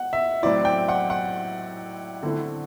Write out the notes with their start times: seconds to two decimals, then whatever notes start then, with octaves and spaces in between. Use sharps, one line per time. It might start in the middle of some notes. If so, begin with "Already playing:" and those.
Already playing: F#5
0.13 E5
0.43 A2 F#3 C4 E4 D5
0.65 G5
0.89 F#5
1.10 F#5
2.23 D3 A3 C4 E4